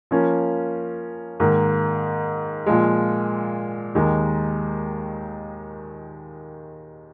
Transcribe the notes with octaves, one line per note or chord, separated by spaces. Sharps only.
F3 A#3 C#4
G#2 D#3 A#3
A#2 F3 G#3
D#2 D#3 G#3